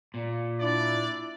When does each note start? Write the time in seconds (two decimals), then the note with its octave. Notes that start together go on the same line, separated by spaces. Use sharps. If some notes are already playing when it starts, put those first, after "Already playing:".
0.14 A#2
0.60 D4 E4 D5